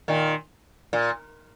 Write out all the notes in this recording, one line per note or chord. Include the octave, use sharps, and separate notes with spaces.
A#2 D#3
A#2